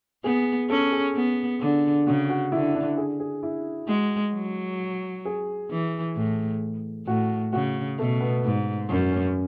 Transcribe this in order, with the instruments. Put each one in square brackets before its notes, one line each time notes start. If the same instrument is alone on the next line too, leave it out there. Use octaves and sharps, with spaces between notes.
[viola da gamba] B3 [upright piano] G#4
[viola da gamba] C#4 [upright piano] A4
[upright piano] G#4
[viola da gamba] B3
D3
[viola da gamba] C#3 [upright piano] F#4
[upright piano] F#4
[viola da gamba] D3 [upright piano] E4
[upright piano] D4
G#4
G#4
E4
[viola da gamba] G#3 [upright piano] F#4
[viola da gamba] F#3
[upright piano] G#4
[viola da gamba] E3
A2
[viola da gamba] A2 [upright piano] F#4
[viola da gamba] C#3 [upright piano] F#4
[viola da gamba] B2 [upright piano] A3
[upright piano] B3
[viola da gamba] G#2
[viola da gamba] F#2 [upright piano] C#4
[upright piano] C#4